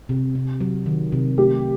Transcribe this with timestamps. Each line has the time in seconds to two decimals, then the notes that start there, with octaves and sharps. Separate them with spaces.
0.09 C3
0.35 C3
0.60 F#3
0.86 D#3
1.12 C3
1.38 A3 G4